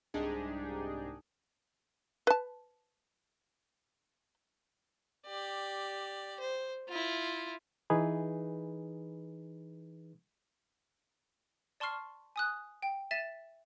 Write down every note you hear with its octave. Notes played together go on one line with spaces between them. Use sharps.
C2 G#2 D4 D#4 G4 G#4
B4 A5
G4 D5
C5
E4 F4
E3 D#4 G#4 B4
D5 A5 C6 C#6 F6 C7
G#5 D#6 F#6
G5
E5 A6 D#7 E7